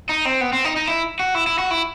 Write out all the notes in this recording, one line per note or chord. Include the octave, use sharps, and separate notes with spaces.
D#4
C4
B3
C4
D#4
D#4
E4
F#4
E4
E4
F#4
E4